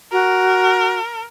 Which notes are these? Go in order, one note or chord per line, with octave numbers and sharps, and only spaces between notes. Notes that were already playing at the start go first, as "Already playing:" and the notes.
F#4 A#4